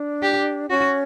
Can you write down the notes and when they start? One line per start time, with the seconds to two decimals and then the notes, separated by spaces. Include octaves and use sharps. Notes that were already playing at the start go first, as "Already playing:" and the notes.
Already playing: D4
0.22 G4
0.69 C#4 F#4